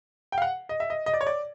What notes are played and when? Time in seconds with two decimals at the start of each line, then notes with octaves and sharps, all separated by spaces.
0.32 G5
0.38 F5
0.42 F#5
0.69 D#5
0.80 E5
0.90 D#5
1.06 D#5
1.14 D5
1.21 C#5
1.27 D5